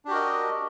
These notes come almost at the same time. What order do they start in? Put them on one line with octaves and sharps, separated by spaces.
D4 G4 F#4 A#4 D#5